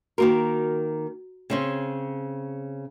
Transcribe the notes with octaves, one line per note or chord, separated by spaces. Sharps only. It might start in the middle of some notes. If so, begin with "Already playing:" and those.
D#3 A#3 F#4 A#4 A#5
C#3 C4 C#4